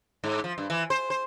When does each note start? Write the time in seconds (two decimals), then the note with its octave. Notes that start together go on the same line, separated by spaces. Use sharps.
0.24 G#2
0.44 F3
0.58 G2
0.70 E3
0.90 C5
1.10 C5